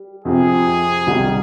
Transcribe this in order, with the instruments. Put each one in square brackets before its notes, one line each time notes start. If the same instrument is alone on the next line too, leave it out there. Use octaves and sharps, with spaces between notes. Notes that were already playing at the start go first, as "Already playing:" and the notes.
Already playing: [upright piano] G3
[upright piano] F2 C3 F3 C4 [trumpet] G#4
[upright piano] C2 C3 D#3 G3